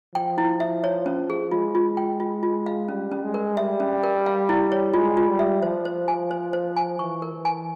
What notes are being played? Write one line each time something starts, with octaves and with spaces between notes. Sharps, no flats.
F3 G5
E4
E5
C#5
C#4
G#4
G#3 F4
F4
G5
F4
F4
F5
G3 C#4
C#4
G#3
A#4
G3 E5
C#4
A#4
F5
E4
C#5
G#3 F4
F4
G3
E5
F3 C5
C5
G#5
C5
C5
G#5
E3 C#6
A#4
E3
G#5